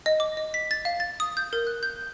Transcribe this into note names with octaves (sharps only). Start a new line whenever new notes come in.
D#5
D6
D#5
B6
A6
F5
A6
D#6
G6
A#4
F#6
G6